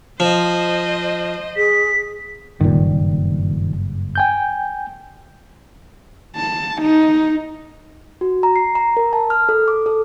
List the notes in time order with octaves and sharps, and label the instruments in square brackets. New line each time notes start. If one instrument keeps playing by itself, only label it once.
[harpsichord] F3 [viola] C5 D#5
[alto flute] G#4 [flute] B6
[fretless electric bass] F#1 G2 [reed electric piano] A#2 D#3
[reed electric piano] G5 G#5 G6
[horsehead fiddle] A5
D#4
[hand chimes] F#4
A#5
C7
A#5
A#4
A5
F6
A4
D6
A4